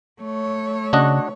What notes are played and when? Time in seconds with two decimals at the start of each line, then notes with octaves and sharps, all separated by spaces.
0.22 A3 C#5
0.93 C#3 D4 F#4 D#5